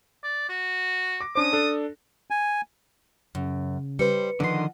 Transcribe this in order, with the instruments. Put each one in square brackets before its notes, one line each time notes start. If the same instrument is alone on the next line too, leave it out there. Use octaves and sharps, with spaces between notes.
[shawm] D5
F#4
[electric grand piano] D6 A#6
[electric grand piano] C#4 D4 C5 [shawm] D#6
[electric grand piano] D4 A4
[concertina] G#5
[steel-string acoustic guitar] F#2 [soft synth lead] C#3
[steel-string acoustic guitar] G3 C5 [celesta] B4 C#7
[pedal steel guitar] D3 D#3 C6 [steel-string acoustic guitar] F3 D#5 [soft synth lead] F#5